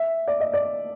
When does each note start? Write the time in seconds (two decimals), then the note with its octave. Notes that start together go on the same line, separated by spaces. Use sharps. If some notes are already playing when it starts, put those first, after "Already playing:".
Already playing: E5
0.28 D5
0.40 D#5
0.53 D5